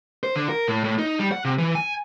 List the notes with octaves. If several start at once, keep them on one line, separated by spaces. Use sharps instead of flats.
C5
D3
A#4
A2
A2
D#4
G3
F#5
C3
E3
G#5